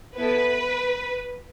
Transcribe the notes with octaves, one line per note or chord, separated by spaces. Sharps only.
B3 E4 A4 B4